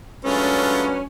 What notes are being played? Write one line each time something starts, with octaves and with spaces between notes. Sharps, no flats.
F#3 G#3 A3 C#4 D4 F4 B4